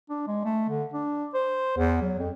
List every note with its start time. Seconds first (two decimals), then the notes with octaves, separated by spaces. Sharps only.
0.10 D4
0.27 G#3
0.45 A3
0.69 D3
0.94 D4
1.34 C5
1.78 E2
2.02 F#3
2.18 F2